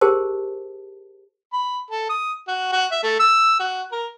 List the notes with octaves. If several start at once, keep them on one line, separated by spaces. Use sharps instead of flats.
G4 G#4 A#4 C5 A5
B5
A4
D#6
F#4
F#4
E5
A3
E6
F#4
A#4